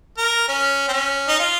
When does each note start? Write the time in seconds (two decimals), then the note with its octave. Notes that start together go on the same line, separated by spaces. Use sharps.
0.18 A#4
0.48 C#4
0.88 C4
0.93 C#4
1.28 D#4
1.39 F4